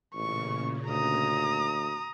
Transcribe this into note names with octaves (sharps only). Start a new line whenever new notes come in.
A1 A#2 C#3 C#6
D2 A#5 D#6